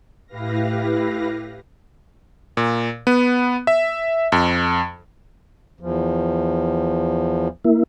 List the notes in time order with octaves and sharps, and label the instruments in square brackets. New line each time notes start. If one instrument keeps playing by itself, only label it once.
[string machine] A2 E4 G4 B4 F5 A#6
[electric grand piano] A#2
B3
E5
F2
[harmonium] E2 F3
[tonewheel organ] A#3 E4